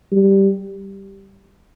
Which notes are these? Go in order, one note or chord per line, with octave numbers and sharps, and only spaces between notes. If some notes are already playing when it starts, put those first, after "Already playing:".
G3